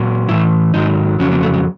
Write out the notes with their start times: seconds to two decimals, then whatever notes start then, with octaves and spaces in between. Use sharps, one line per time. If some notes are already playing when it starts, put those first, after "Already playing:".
Already playing: A#2 F#3
0.29 A2 E3 E4
0.74 G#2 D#3 F#3 D#4
1.19 F2 C#3 F#3 C#4
1.31 A#3
1.43 A3
1.54 G#3